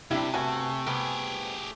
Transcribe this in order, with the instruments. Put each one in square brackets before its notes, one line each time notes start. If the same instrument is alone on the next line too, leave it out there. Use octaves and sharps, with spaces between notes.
[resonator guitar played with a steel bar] F#2 G3 G4 [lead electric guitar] C3 [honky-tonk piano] D4 E4
[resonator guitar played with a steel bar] G2 B3 F#4 [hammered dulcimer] A3 [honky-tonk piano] G#5
[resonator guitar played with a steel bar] C3 G3 B3 [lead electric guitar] G4 G#4